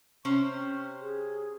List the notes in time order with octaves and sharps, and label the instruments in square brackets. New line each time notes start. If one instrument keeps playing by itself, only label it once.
[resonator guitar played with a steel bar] C3 C#4 C5 [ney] C#6
[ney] G#4